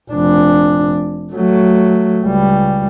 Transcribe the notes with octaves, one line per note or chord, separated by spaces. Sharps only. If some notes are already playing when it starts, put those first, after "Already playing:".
F1 D4
F#3 A3
C#2 G3